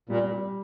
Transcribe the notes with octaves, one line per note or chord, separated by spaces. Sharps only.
A#2 G3
G3